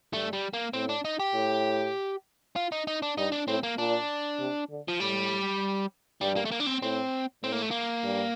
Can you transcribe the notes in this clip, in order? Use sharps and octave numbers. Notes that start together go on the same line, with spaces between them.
G2 A3
G3
A#3
A2 C4
D4
D#4
G4
A2
F4
D#4
D#4
D4
G2 D#4
D4
A2 C4
A#3
A#2 D4
C3
D3
F3
A2 G3
G2 G3
A#3
A3
A#3
D4
C4
A2 C4
A2 C4
A#3
A3
A#3
G2